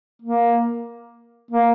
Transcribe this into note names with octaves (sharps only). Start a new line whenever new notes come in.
A#3
A#3